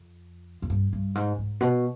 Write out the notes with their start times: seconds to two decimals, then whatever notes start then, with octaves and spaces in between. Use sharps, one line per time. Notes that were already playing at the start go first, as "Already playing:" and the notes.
Already playing: F2
0.62 F2
0.70 G2
0.93 G2
1.15 G#2
1.38 G#2
1.60 B2